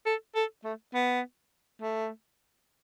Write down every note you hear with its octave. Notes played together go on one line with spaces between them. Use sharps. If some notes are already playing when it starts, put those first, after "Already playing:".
A4
A4
A3
B3
A3